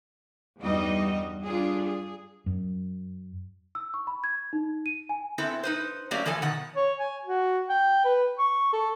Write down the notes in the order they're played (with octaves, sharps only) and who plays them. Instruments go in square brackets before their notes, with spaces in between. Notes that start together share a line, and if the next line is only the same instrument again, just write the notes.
[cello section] E2 G2 G3 D#4 F#4 D#5
G3 D4 F4 G#4
G#4
[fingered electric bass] F#2
[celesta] E6
C#6
B5
G#6
D#4
D#7
G#5
[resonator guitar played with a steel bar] B3 C4 E4 A4
D#4 B4 C5
F#3 A3 A#3 C#4 G4 D5
E3 F3 A4 G#5
B2 D#3 F#5
[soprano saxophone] C#5
G#5
F#4
G5
B4
C#6
A4